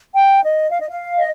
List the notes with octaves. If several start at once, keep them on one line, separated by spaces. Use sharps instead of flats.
G5
D#5
F5
D#5
F5
D#5